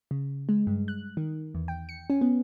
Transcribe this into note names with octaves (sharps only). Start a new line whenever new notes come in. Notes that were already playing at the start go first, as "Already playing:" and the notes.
C#3
G#3
G2
F#6
D#3
E2
G5
C#7
C#4
B3